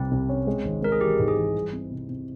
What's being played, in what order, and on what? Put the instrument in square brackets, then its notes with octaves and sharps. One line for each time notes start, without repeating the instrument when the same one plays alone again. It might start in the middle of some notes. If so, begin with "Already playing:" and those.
Already playing: [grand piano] C2 C3 G3 C#4 [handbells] C4
[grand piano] C2
C#4
G#3
G#1
[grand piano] G#3 [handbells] A#4
[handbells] G#4
[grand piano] E3 [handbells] G4
[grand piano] G#2
[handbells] G#4
[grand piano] E3
G3
C4
C3
C3